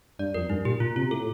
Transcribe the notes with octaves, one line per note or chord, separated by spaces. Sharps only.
G2 D5
F2 A#4
G2 D#4
A#2 G4
A#2 F4
C3 F4
A2 A4